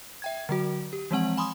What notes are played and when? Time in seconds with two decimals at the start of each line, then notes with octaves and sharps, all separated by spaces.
0.22 E5 G5 G#6
0.49 D3 F#3 F#4
0.93 G4
1.11 E3 F3 G#3 C4 F#5 F#7
1.37 G#5 B5 C6 D#6